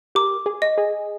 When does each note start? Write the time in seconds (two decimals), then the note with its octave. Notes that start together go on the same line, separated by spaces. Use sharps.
0.15 G4 A#4 D6
0.46 G#4
0.62 D#5
0.78 G#4